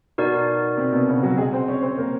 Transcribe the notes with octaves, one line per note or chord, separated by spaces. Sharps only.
B2 B3 D#4 F#4 A#4 D5
C3 C4
B2 B3
C#3 C#4
F#3 F#4
G#3 G#4
C4 C5
C#4 C#5
C4 C5
A#3 A#4